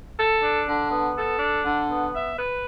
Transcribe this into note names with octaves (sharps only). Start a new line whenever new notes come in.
A4
D4
D3
B3
A4
D4
D3
B3
E5
B4